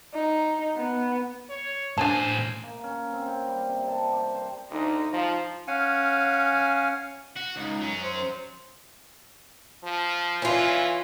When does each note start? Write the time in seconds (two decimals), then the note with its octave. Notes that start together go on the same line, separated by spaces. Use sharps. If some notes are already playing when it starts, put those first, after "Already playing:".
0.14 D#4
0.77 B3
1.49 C#5
1.98 A2 D4 G#4 C5 G#5 A5
2.63 A#3
2.84 C#4
3.13 C4
3.28 G5
3.48 G3
3.69 C3
3.88 A5
4.13 G4
4.35 C5
4.71 D2 D#4
5.13 F3
5.68 C#4 F5 F#5 G#5
7.37 F#4
7.56 C#2 D#4
7.81 F#3 C#4
8.02 C5
9.84 F3
10.42 E3 C#4 F4